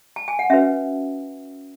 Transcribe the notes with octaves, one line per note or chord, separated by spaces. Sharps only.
A5
G#5
F#5
C#4 F#4 B4 E5